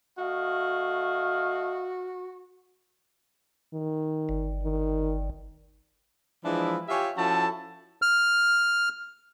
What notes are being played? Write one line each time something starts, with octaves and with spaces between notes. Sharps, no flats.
A3 F#4 D#5 F5
D#3
G1
D#3
E3 F3 G#3 D4 E4
F4 G4 C#5 E5 G5 G#5
F3 C#4 E4 F#4 A4 A5
F6